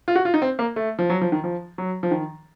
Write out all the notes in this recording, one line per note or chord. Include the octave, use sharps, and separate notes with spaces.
F4
F#4
F4
D#4
C4
A#3
A3
F3
F#3
F3
D#3
F3
F#3
F3
D#3